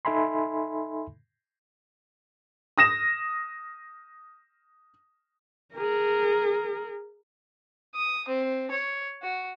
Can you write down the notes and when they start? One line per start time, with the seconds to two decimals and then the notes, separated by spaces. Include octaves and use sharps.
0.05 D#4 A4 E5 G#5 B5 C6
2.78 D#6 A#6 E7
5.75 G#4 A#4
7.95 D#6
8.28 C4
8.71 C#5
9.22 F#4